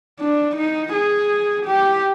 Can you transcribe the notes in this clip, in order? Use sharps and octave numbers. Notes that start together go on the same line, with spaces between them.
D4
D#4
G#4
G4